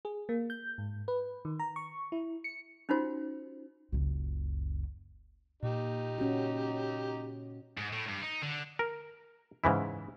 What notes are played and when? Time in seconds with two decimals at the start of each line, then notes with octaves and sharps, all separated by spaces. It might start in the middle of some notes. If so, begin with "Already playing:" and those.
0.05 G#4
0.29 A#3
0.50 G6
0.78 G#2
1.08 B4
1.45 D#3
1.59 A#5
1.76 C#6
2.12 E4
2.44 C#7
2.89 C#4 D#4 F4 F#4 C5
3.92 F#1 C#2
5.63 A#2 D#4 G4
6.18 C#4 F#4
7.78 G#2
7.93 A2
8.08 G2
8.23 D#4
8.42 D3
8.79 A#4
9.64 G#2 C#3 E3 E4